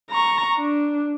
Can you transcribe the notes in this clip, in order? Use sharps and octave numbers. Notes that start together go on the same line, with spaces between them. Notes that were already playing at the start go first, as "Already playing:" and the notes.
A#5 C#6
D4